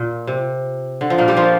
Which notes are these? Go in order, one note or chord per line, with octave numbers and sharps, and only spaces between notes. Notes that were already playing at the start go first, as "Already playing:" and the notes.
Already playing: A#2
C3
D3
F3
A#2 A#3
G3 G4
F3 F4